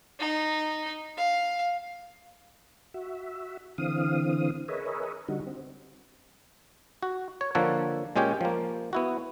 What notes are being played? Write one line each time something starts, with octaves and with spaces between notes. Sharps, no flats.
D#4
F5
F#4 E5
D3 E3 C4 F5 D#6
G#4 A#4 B4 C#5 D#5 E5
D3 G3 D#4 F#4
C4
F#4
C#5
D3 F3 A#3 A4 C#5 F#5
A#2 G#3 C#4 G4 C#5 G5
F3 A#3
B3 E4 F#4